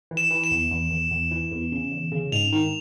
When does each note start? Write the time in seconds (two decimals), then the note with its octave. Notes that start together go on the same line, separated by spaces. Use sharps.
0.11 E3
0.17 E7
0.31 E3
0.44 E7
0.51 E2
0.71 E2
0.91 E2
1.11 E2
1.31 E3
1.52 E2
1.72 C#3
1.92 E2
2.12 C#3
2.32 G#2 F7
2.52 D#3